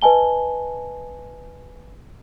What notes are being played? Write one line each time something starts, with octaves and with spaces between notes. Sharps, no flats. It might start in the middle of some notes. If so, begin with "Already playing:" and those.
B4 D#5 G#5 A5 G7